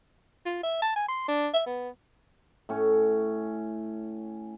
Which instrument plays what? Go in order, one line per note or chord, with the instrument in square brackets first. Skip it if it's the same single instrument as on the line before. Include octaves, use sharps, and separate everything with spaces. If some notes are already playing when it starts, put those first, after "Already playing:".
[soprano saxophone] F4
E5
A5
G#5
C6
D4
E5
B3
[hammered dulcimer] A2 C#4